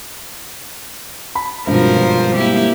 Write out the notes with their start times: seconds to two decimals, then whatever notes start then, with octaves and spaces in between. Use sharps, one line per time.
1.35 B5
1.67 G#1 G2 B2 F3 A#4 C5
2.36 A#3 E4 G4